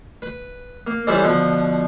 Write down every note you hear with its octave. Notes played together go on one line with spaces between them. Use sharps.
B4
A#3
E3 G3 C#4 A4 C5 D5
B2 D3 F3